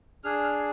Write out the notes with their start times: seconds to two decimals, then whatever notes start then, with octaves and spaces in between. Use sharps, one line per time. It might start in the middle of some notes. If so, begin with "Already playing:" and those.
0.24 D4 G#4 F6
0.43 F6